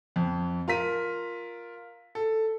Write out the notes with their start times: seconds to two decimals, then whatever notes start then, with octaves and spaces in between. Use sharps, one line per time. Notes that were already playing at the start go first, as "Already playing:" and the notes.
0.16 F2
0.68 F4 A#4 B6 D#7
2.15 A4